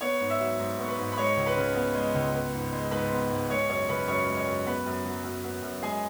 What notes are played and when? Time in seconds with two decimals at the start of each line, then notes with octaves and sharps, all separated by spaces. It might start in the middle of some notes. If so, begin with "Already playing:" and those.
0.01 B3 C#5 C#6
0.20 G#2
0.30 E5 E6
0.40 F#3
0.59 G#2
0.79 B3 C#6
0.88 B4 B5
0.98 G#2
1.12 B5
1.17 G#3 C#5 C#6
1.37 C#2
1.46 B4 B5
1.56 C#3
1.76 B3
1.95 G#3
2.15 C#2
2.34 B3
2.54 G#2
2.72 G#3
2.91 G#2 B4 B5
3.12 B3
3.31 G#2
3.50 G#3 C#5 C#6
3.69 F#2 C#5 C#6
3.88 C#3 B4 B5
4.08 F#2 C#5 C#6
4.27 G#3
4.37 C#5 C#6
4.47 F#2
4.66 B3 B4 B5
4.86 F#2
5.05 F#3
5.24 F#2
5.44 B3
5.62 F#2
5.82 G#3 G#4 G#5